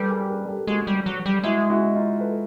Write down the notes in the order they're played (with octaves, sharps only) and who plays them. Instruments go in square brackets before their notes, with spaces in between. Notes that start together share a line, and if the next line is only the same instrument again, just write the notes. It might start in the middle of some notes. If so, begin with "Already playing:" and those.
Already playing: [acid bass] G3 [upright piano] A4 B4
[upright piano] G#4 A#4
G#4 A#4
G4 A4
[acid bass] G#3 [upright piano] F#4 G#4
[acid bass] G3
F#3
G3
[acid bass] G#3 [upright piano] E4 F#4
[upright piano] E4 F#4
D#4 F4
A4 B4